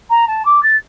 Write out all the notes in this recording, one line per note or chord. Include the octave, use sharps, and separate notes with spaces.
A#5
A5
D6
A6